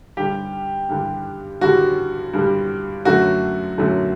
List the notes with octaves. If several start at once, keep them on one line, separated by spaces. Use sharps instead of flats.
G2 D3 G3 G4
G2 D3 G3
G2 D3 G3 F#4
G2 D3 G3
F#2 D3 F#3 A3 F#4
F#2 D3 F#3 A3